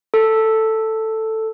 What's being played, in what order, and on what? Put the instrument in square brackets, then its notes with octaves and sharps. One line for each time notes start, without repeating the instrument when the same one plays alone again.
[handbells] A4